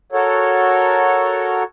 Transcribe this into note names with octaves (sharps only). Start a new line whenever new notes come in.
F#4 A4 A#4 C#5